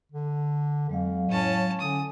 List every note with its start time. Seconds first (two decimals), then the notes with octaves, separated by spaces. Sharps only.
0.12 D3
0.89 F2 F#3 G#3 F5
1.29 A2 C#4 A5
1.80 D3 C#4 G#5 D#6